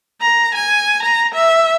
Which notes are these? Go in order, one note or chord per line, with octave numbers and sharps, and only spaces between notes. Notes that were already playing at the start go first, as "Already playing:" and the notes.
A#5
G#5
A#5
E5